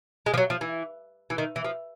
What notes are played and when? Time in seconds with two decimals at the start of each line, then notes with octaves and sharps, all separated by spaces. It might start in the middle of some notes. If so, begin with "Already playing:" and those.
0.26 G#3
0.34 F3
0.38 F#3
0.50 F3
0.61 E3
1.30 E3
1.38 D#3
1.56 E3
1.64 F3